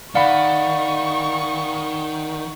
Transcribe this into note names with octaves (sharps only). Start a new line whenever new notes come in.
D#3 D5 F5 F#5 B5 C#6